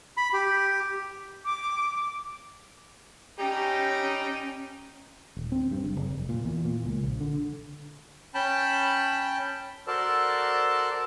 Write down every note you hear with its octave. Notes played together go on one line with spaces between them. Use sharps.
B5
G4
D6
G3 C#4 D#4 G4 A#5
D#1
C4
G2
F#1
F#1
F1
A#2
E2
A#2
C#2
A#1
D3
C#4 G5 A5 B5
F#4 A4 A#4 C5 D5 A5